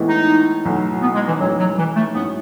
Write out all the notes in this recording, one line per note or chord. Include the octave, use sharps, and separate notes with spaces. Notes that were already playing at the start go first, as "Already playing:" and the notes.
Already playing: A2 E3 G#3 B3 E4
D#4
B1 A2 F#3
B3
G#3
E3
B1 A2 F#3 G#3 C#4
F#3
E3
A3
G#2 F#3 B3 C#4 E4